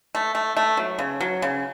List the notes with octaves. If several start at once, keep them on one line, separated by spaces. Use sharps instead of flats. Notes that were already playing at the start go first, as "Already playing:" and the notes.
A3
A3
A3
F#3
C#3
F#3
C#3